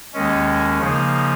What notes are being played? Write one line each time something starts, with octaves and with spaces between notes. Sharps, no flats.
D#2 D#3 G#3 C#4
C#3 F3 A#3 D#4